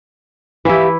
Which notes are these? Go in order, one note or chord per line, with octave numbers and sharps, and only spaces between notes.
E3 E4 G4 E5 F5